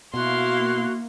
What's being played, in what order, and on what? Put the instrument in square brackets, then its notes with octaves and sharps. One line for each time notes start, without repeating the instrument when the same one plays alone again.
[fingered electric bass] B2 [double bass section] A#3 [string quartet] E4 F5 C6 [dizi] F#4